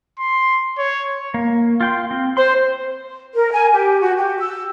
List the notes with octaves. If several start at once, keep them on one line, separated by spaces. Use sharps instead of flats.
C6
C#5
A#3
F4 G5 C6
C4
C5 C6
A#4
G#5
G4
F#4
G4
E6